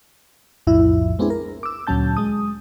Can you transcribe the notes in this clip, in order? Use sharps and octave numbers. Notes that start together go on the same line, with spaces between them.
B1 F2 A2 F3 E4
G#3 B3 C4 D4 E4 G#4
A#4
D6 E6
D2 A#2 F#3 C#4 A5 G6
G#3 D#6